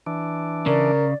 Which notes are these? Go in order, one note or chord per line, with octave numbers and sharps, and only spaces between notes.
E3 D4
C#3 A#4 D5